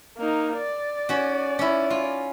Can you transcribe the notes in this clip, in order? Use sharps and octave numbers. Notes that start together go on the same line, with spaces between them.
A#3 D#4
D5
C#4 F#4
C#4 E4
F4